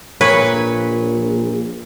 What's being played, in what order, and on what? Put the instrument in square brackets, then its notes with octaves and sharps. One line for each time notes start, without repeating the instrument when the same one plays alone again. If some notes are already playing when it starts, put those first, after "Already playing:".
[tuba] A#1 [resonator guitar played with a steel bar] A#2 A#4 C#5 [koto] B4